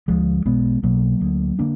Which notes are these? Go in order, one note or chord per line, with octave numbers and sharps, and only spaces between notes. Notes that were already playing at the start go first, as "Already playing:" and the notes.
D2 D3 F3 G#3
B1 B2 G#3 B3
B1 B2 F#3 A#3
D2 D3
D3 A#3 D4